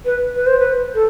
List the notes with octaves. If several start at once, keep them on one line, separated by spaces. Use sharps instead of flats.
B4
B4
C5
B4
A4